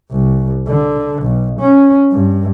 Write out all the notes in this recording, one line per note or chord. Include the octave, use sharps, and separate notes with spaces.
C2
D3
B1
C#4
G2